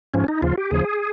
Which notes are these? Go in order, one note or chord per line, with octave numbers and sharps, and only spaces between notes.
G#2 F3 C#4
D#4
D#2 C#3 F3 F4
G4
D#2 C#3 F3 G#4